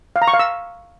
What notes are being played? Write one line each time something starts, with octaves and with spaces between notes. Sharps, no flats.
F5
A#5
C#6
F5
E6